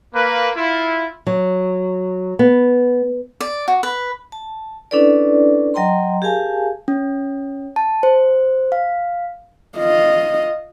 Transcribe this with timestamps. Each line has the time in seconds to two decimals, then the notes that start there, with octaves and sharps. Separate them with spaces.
0.14 A#3 B4
0.56 E4 F4
1.27 F#3
2.39 B3
3.40 D5
3.68 F#4
3.83 B4
4.32 A5
4.91 C#4 D4 E4 A4 B4 D5
5.74 F#3 D#5 G5 A#5 C6
6.22 G4 G#4 A#4 F5 G#5 A5
6.88 C#4
7.76 A5
8.03 C5
8.72 F5
9.78 F4 D#5